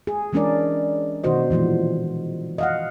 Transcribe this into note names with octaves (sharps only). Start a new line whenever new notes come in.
G#4
E3 G#3 C#4 D4 A#4 D5
B2 D#3 D#4 F#4 C5 D#5
A#2 E3 F3 G#3
D#5 F5 F#5